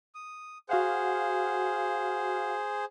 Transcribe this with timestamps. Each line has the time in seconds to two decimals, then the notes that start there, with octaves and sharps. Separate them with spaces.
0.15 D#6
0.69 F#4 G#4 C5 F5 F#5